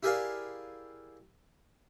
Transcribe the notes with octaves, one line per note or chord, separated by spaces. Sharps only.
E4 G4 G#4 A#4 D5 F5